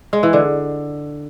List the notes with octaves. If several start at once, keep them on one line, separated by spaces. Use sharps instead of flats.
G#3
E3
D3